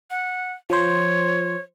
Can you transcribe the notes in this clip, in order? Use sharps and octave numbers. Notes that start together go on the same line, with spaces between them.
F#5
F3 C5 C#5